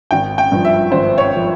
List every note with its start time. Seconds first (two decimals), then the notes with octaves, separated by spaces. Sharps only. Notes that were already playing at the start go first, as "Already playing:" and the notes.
0.11 G#1 G5
0.38 G5
0.52 G2 F3
0.65 E5
0.91 G#1 C5
1.18 C#5
1.35 F3